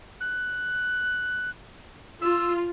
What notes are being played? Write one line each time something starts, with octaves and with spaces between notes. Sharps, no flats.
F#6
F4 E6